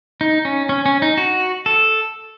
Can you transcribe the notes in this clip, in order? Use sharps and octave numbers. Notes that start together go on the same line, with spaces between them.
D#4
C#4
C#4
C#4
D#4
F#4
A4